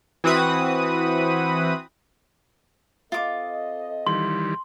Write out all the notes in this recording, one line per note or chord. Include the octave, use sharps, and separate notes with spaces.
E3 C4 F#4 B4 D#6
C4 F4 A4 D#5 D6
D#3 E3 G3 C6